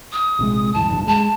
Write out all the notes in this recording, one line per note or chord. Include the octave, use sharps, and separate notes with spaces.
D#6
A#1 C3 G#3
D1 G2 E3 A5
F#1 B1 G2
G#3 A5